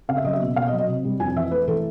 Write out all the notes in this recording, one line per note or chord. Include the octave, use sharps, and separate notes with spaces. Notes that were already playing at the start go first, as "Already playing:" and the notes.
C#3 F5
E5
F#3 D#5
E5
B2
B2 F5
D#5
F#3
D#5
C3
G3
F2 G#5
E3 E5
A3 B4
E3 A4